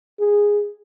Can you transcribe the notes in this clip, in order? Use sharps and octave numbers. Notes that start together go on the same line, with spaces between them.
G#4